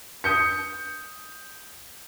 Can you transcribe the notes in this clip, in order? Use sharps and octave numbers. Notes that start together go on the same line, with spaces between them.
D#6 G6 C#7